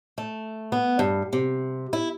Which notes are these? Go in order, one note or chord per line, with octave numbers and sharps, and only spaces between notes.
A3
B3
G2
C3
E4